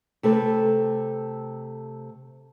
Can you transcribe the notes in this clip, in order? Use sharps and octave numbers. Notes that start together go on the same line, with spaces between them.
C3 A3 A4 B4